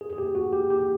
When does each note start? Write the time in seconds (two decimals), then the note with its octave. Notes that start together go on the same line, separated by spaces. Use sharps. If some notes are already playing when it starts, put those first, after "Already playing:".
0.01 G#4
0.13 G#4
0.18 G4
0.35 F#4
0.53 G4
0.70 G4